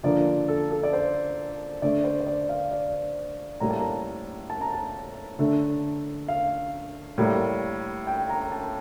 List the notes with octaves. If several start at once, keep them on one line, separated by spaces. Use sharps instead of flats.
D3 F3 A#3 D5
A4
A4
D5
C5
D3 A3 D5
C5
C5
D5
F5
D5
A2 G3 A#3 A#5
A5
A#5
A5
A#5
A5
D3 A3
F5
A2 G3 A#3
G5
A#5
A5